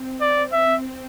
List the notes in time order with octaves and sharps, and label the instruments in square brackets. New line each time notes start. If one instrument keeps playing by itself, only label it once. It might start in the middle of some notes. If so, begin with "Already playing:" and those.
Already playing: [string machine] C4
[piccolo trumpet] D5
E5